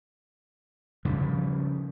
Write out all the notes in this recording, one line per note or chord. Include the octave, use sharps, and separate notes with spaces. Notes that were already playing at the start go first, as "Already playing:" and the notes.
C#3 F3 G3